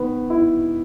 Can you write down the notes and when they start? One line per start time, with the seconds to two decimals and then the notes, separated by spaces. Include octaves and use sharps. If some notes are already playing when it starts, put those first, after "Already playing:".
Already playing: D#3 B3
0.30 E4